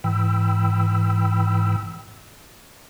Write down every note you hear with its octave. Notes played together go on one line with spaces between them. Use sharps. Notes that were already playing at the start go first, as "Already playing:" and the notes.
G#2 E3 G5 B5 E6